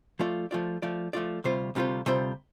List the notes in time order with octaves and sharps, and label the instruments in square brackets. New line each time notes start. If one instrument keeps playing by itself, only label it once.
[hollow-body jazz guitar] F3 A3 F4 D5
F3 A3 F4 D5
F3 A3 F4 D5
F3 A3 F4 D5
D2 C3 G3 F4 C5
D2 C3 G3 F4 C5
D2 C3 G3 F4 C5